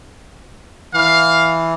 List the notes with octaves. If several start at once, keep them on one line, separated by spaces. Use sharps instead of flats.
E3 F5